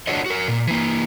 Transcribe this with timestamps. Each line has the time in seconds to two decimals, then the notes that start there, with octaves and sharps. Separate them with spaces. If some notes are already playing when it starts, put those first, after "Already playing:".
0.07 D4 F4 F#4 C#5 D#5
0.26 F#4 A#4
0.48 A#2
0.67 E3 A#3